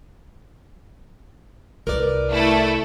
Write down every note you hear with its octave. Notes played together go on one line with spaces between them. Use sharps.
C2 A#4 B4 D5
A3 E4 A4